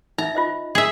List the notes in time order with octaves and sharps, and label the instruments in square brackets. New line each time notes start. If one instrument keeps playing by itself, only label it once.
[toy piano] D#4 E5 [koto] A#5
[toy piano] F4 C5 D#5
[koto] G#4 E5